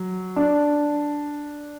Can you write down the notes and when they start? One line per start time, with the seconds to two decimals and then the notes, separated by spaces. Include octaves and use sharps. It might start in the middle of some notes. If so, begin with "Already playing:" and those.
Already playing: F#3
0.36 D4